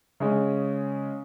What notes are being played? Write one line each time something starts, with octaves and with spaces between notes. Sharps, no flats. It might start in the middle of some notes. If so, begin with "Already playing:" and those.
C#3 G#3 C#4